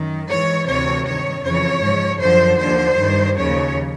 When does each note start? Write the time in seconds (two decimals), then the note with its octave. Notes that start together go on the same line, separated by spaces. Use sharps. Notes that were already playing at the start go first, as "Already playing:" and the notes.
Already playing: F#2 D#3
0.28 G#2 E3 C#5
0.66 D2 C3 E3 C#5
1.05 G2 D#3 C#5
1.43 F2 C#3 E3 C#5
1.82 G#2 F3
2.20 F#2 D3 F3 C5
2.58 D#2 D3 F3 C5
2.98 G2 D#3
3.36 D#2 C#3 F3 C#5